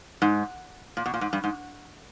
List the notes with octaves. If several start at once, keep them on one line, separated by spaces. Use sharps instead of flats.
G#2
A#2
B2
A#2
G#2
G2
G#2